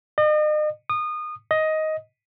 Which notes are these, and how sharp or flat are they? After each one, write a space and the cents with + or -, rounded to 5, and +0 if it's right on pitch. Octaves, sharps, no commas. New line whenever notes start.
D#5 -40
D#6 -25
D#5 +10